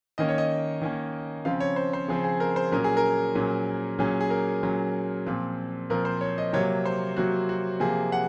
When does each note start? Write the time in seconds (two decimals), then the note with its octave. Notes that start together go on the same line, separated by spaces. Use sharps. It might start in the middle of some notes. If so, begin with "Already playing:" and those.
0.18 D#3 A#3 C#4 D#5
0.29 C#5
0.38 D#5
0.82 D#3 A#3 C#4
1.45 C#3 F3 C4 F5
1.60 C#5
1.76 C5
1.93 C5
2.08 C#3 F3 C4 G#4
2.24 G#4
2.40 A#4
2.56 C5
2.72 A#2 F#3 C#4 A#4
2.84 G#4
2.97 A#4
3.35 A#2 F#3 C#4
3.99 A#2 F#3 C#4 G#4
4.21 G#4
4.30 A#4
4.63 A#2 F#3 C#4
5.26 A#2 F3 C4
5.90 A#2 F3 C4 A#4
6.05 C5
6.21 C#5
6.38 D#5
6.53 C3 F#3 A#3 C#5
6.85 C5
7.16 C3 F#3 A#3 F#4
7.49 F#4
7.80 C3 F3 A#3 G#4
8.12 F#5